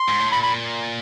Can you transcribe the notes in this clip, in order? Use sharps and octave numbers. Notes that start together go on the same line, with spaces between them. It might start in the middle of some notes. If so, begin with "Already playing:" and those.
Already playing: C6
G#2
A2
A#2 B5
B5